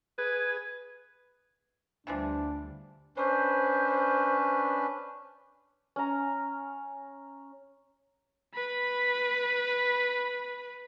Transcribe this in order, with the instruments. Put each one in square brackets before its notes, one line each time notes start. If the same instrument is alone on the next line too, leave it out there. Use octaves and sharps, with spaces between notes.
[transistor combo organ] G#4 [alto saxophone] B4
[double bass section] D2 G3 [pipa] C3 E3 F3 [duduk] D4
[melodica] C#4 D4 B4 [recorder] C5
[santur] C#4 A#5
[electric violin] B4 B5